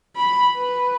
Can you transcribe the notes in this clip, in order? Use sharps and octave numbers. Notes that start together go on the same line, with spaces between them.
B5
B4